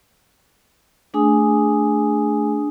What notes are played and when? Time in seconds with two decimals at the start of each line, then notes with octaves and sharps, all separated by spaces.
1.14 A3 D4 G#4 G#5 D#6